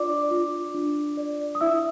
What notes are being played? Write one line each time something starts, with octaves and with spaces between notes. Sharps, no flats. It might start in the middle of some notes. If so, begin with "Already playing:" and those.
Already playing: D4 F4 D5 D6
F4
D4
D5
D#6
E4 E5 E6